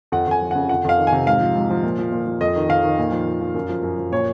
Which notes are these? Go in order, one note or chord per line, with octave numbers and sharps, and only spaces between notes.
F2 F#5
F2 G#5
F3
C#3 F#5
F2 F#5
F2 F5
D#3
G#5
C3
G#2 F5
F3
G#2
F3
A#2
F3
A#2
F3
F2 D#5
D#3
F2 F5
D#3
A#2
F3
A#2
F3
F#2
F3
F#2
F3
A#2 C#5